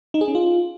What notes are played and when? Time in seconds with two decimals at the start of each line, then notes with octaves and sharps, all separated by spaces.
0.14 D#4
0.21 G#4
0.28 C#4
0.35 F4